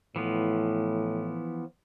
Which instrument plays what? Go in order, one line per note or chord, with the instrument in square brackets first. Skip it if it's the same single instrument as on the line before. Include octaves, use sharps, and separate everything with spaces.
[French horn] A2 [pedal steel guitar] E3 F3 B3